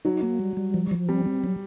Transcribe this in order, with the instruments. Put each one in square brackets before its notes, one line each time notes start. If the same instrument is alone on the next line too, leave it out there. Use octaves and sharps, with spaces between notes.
[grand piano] F#3 [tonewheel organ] D#4
[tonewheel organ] A#3
G3
G3
F3
F3
[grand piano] G3 [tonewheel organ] C4
[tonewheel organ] C4
F#3